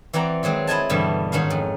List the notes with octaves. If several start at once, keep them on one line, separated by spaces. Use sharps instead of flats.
E3 C4 D5 F#5 A#5
D#3 F#3 G#3 C4
E4 D#5 G#5 A5
G2 B2 D3 E3 E5
G#2 D#3 C#4 F#4 F5
F2